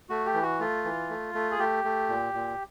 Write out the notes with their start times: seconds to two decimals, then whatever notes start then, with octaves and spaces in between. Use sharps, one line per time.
0.09 A3 F#4
0.26 G4
0.34 E3
0.42 F#4
0.60 A3 F4
0.85 E3
1.09 A3
1.34 A3
1.51 G#4
1.59 A3 G4
1.84 A3
2.09 A#2
2.34 A#2